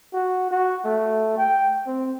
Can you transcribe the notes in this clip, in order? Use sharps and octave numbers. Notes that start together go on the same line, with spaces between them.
F#4
F#4
A3
G5
C4